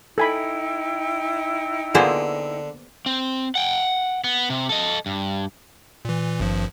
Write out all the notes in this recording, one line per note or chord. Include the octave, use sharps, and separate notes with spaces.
D#4 E4 A4 G5 G#5 B5
D3 A#3 B3 F4 G#4 C5 G#5
C4
F#5 G5
B3
C3
A4 D#5
G2
A#2 E3
G#1 G2 F3